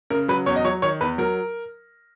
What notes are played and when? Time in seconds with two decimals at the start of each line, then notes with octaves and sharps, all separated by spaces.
0.10 C#3 A#4
0.28 F#3 B4
0.46 E2 C#5
0.56 D#5
0.65 F#3 C#5
0.82 D#3 C#5
1.01 E2 B4
1.18 F#3 A#4